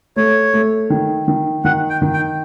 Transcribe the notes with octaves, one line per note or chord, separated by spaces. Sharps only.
A3 C#5
A3
D#3
D#3
D#3 F#5
G5
D#3
G5